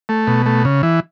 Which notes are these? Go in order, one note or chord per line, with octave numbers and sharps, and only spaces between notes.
A3
B2
A3
C#3
E3